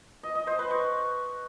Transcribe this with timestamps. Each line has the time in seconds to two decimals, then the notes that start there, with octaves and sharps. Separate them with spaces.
0.23 D#5
0.35 D#5
0.47 C5
0.59 B4
0.71 C#6